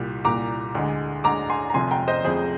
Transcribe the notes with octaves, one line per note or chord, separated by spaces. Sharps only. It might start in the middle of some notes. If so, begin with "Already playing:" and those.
Already playing: C2 A#2 G3
C2 A#2 G3 A#5 D6
D2 D3 G#3
D2 D3 G#3 A#5 D6
G#5 C6
A#5
F1 F2 C3 G#5 C6
G5 A#5
C5 D#5
F1 F2 C3 G#4 C5